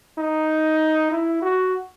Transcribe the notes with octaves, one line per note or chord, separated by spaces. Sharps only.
D#4
E4
F#4